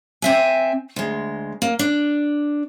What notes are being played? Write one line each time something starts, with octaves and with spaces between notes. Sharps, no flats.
C4 E5 G#5
D2 G#3
A#3
D4